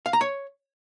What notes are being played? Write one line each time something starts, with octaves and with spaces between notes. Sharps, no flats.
F5
A#5
C#5